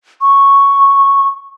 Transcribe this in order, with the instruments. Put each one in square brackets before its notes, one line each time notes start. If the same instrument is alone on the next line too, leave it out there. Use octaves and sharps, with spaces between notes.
[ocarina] C#6